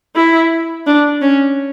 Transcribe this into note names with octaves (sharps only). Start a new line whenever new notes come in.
E4
D4
C#4